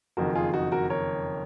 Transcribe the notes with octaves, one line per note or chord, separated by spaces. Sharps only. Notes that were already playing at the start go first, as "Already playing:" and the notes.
F#1 F2 D#3 F#4 A#4
F4 G#4
D#4 F#4
F#4 A#4
A#4 C#5